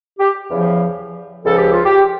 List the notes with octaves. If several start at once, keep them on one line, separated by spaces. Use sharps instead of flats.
G4
E2 C#3 F3
C#2 C#3 F3 A4
G4
F4
G4